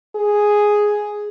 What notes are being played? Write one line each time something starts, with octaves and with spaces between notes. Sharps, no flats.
G#4